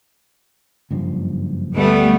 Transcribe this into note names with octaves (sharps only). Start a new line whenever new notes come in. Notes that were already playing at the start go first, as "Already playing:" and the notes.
F#1 G2 F3
D2 G3 A3 B3